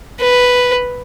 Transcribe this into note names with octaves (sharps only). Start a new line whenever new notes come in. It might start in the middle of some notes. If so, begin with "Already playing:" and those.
B4